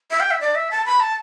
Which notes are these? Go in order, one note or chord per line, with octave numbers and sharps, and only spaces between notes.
E5
G5
E5
D5
E5
A5
B5
A5